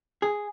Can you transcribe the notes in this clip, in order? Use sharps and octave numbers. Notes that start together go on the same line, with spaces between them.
G#4